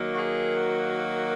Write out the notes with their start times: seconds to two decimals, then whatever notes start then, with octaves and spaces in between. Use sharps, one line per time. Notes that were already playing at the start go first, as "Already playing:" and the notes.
Already playing: D#3 F#3 A#3
0.14 F#4
0.19 G#4
0.56 F#4